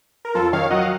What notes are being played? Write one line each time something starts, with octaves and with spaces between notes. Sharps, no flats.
A#4
F2 F4 A4
D#3 C#5 F5
F#3 D#5 F#5
F5